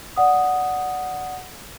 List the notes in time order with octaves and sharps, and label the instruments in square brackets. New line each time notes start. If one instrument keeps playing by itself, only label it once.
[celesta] D5 F#5 D#6